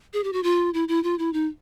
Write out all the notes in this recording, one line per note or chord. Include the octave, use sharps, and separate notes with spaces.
G#4
G4
F#4
F4
E4
E4
F4
E4
D#4